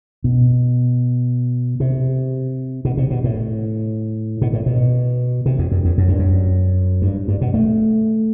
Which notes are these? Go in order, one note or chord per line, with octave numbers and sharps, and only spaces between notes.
B2
C3
B2
C3
B2
A2
B2
A2
B2
C3
E2
F#2
E2
F#2
G2
F#2
G2
G2
B2
A3